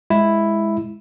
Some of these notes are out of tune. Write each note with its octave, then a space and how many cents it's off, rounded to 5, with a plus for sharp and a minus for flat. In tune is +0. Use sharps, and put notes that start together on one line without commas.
G#3 +0 E4 +0